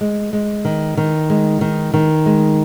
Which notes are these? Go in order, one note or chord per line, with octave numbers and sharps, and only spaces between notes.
G#3
G#3
D#3
D#3
G#3
D#3
D#3
G#3